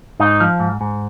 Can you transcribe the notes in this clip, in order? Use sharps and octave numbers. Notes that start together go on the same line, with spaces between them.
G#2 D#4
F3
G#2
G#2